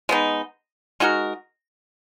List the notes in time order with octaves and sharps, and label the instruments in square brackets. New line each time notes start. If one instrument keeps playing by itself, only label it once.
[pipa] G#3 B3 D#4
G#3 D#4 F#4 A#4